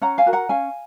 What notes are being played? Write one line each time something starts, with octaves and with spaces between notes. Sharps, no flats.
C#4 F#5 A#5
F5 G#5
F#4 A#4
F#5 A#5
C#4 F5 G#5